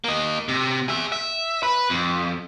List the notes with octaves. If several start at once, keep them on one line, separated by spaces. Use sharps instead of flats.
A#3 D#5
C3
G#4 E5
E5
B4
F2